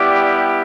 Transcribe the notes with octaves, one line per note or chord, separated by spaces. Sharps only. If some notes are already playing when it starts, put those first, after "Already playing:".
Already playing: G3 B3 E4 G4 D5